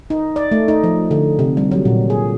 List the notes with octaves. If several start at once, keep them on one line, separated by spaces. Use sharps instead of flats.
D#4
D5
A3
D#4
F3
D3
C3
G3
F#3
A#2
G#4